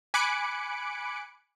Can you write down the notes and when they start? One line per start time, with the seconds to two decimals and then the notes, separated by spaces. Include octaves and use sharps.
0.14 G#5 B5 D6 F#6 C#7 D7